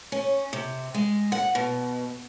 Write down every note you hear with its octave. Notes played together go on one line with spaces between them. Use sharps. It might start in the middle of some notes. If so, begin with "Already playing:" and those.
C#4
C3
G#3
F#5
B2